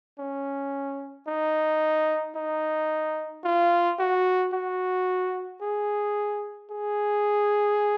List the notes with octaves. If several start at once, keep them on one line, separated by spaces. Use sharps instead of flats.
C#4
D#4
D#4
F4
F#4
F#4
G#4
G#4